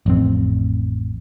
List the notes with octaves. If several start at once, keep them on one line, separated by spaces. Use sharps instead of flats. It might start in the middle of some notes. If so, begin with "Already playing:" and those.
A1 F2 C4